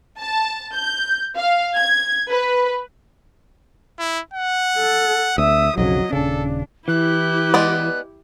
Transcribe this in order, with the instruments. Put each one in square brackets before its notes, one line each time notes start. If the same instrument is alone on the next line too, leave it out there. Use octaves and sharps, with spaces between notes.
[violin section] A5
G6
F5
G#6
B4
[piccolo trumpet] E4
F#5
[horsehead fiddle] A4
[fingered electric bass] D2 [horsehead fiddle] E5 [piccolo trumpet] D#6
[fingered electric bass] B1 F2 C#3 [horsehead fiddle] F#3 [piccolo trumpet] D#5
[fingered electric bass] D#1 C#3 [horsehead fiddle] D4 [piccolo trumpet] A4
[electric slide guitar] E3 [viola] E4 G4 [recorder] F#6
[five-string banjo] G#3 B3 D5